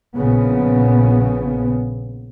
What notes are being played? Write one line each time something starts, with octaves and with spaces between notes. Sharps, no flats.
A#1 C#3 B3